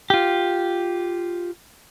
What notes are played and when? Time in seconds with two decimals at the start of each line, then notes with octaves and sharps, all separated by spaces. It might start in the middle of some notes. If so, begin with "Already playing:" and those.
0.10 F4 G4